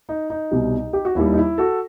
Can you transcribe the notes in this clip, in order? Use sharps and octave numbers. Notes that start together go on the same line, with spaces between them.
D#4
D#4
C2 B2 G3
G4
F#4
D#2 D#3 G3 E4
D#4
E4
F#4 A4